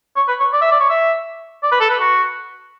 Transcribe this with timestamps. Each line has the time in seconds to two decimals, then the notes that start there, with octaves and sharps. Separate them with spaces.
0.16 C#5
0.28 B4
0.40 C#5
0.53 D5
0.61 E5
0.71 D5
0.80 C#5
0.90 E5
1.63 D5
1.72 B4
1.80 A4
1.90 B4
1.99 F#4